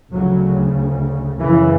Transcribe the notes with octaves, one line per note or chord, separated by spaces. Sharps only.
D2 C#3 F#3
F#2 C#3 E3